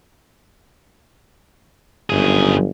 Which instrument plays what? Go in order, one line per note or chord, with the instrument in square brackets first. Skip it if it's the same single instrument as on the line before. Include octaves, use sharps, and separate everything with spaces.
[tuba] G1 [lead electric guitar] F#2 G#4